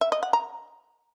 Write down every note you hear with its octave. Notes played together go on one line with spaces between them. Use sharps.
E5
D#5
F#5
A#5